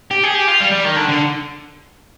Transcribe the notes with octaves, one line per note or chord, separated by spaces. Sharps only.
G4
G#4
G4
F4
G3
G3
D#3
D3
D3